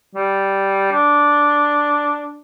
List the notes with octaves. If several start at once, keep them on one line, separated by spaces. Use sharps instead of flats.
G3
D4